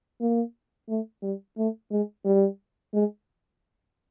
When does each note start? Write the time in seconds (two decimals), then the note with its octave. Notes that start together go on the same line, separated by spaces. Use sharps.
0.21 A#3
0.89 A3
1.22 G3
1.57 A3
1.91 G#3
2.25 G3
2.94 G#3